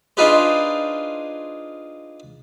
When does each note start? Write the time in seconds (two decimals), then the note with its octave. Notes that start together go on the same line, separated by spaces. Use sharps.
0.17 D4 D#4 F4 G#4 B4 C5